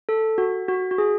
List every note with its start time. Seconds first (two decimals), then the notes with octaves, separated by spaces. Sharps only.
0.09 A4
0.38 F#4
0.68 F#4
0.91 F#4
0.98 G#4